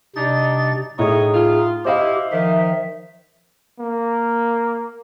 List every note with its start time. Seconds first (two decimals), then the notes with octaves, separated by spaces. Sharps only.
0.16 C3 G3 D4 D#4 A6
0.99 A2 D#4 G#4 C#5 D#5
1.34 F4
1.85 E4 G4 C5 D#5 F5
2.32 D#3 F3 E5
3.79 A#3